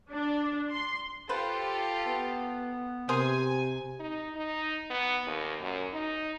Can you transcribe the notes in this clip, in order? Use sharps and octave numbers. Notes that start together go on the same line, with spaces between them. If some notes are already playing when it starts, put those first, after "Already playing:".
D4
C6
F4 G4 A4 B4 C5
B3
C3 G#4 A#4 C5 G#5
D#4
D#4
B3
D#2
F#2
D#4